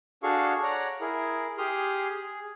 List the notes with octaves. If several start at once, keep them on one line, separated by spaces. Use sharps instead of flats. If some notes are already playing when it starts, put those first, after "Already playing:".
D4 F#4 G#4 A4 F5 C#6
C#5 D5 F#5 A#5
E4 G#4 A#4
G4 G#4 C6 D#6 F6
G#4